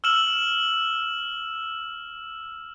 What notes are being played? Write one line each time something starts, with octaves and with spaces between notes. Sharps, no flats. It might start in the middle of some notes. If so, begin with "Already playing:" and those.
E6 F6 E7 F#7